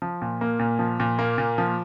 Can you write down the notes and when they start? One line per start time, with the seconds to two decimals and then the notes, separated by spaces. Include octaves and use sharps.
0.02 F3
0.22 A#2
0.41 A#3
0.59 A#2
0.79 F3
1.00 A#2
1.19 A#3
1.38 A#2
1.58 F3